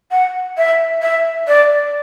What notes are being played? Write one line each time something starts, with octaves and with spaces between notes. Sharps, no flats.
F#5
E5
E5
D5